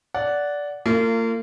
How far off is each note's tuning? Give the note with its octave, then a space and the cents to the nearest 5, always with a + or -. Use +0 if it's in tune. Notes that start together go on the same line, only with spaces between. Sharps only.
D5 -15 F#5 +0
A#3 -40 F4 -25